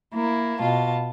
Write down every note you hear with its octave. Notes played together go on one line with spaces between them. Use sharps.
A#3 E4 A#4
B2 F4 A5